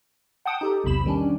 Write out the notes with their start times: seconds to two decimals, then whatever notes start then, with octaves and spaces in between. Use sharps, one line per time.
0.46 F#5 G5 A5 D#6
0.61 D#4 G4 A4
0.84 B1 E2 C3 B5 E7
1.06 D#3 G3 C#4 D4